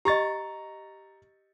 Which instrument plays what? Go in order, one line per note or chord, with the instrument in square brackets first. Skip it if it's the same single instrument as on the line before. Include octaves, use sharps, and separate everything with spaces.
[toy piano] G4 D#5 [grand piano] A#5 C#6 A6